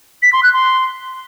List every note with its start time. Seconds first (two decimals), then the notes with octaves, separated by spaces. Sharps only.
0.23 B6
0.33 C6
0.43 F#6
0.53 C6